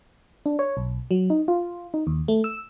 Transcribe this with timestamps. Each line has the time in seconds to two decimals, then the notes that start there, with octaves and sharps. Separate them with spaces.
0.46 D4
0.59 C#5
0.77 B1
1.11 F#3
1.30 D#4
1.48 F4
1.94 D#4
2.07 D#2
2.28 A3
2.44 E6